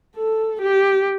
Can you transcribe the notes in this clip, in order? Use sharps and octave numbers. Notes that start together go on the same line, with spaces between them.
A4
G4